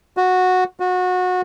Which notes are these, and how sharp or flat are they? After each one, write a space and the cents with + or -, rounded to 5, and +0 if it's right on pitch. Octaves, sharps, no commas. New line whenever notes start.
F#4 -10
F#4 -25